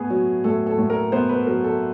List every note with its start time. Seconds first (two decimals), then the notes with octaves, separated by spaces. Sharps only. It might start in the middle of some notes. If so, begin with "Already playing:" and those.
Already playing: A2 B3 G#4
0.10 F#3
0.44 A2 A4
0.67 A4
0.78 A2
0.90 A#4
1.12 B3 C5
1.29 B4
1.47 F#3 A#4
1.64 A4